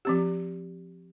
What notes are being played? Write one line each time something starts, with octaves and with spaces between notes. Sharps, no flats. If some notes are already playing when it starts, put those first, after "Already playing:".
F3 C4 G4